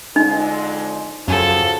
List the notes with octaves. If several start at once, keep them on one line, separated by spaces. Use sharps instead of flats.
F2 D3 G#3 D#4
F#2 C#3 F3 F#3 A4 G#5